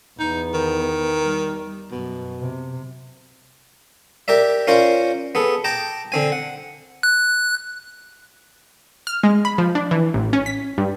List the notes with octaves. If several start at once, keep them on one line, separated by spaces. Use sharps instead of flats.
E2 B3 D#4
D#3
G3
F#2 B2
C3
G4 A#4 D5 E5
C#4 F4 A#4 C5 D5
B3 G#4 A4
G5 A5 A#5 D6
D3 C4 G#5
F#5
F#6
F6
G#3
B5
F3
D4
E3
A1
C#4
B6
G2